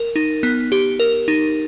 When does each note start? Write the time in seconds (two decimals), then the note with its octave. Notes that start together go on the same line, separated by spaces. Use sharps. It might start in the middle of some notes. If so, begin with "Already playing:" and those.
Already playing: A#4
0.16 D#4
0.43 B3
0.72 G4
1.00 A#4
1.28 D#4